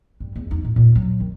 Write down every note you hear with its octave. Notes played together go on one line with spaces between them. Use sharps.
G2
E2
D#4
A2
A#2
F#3
D#3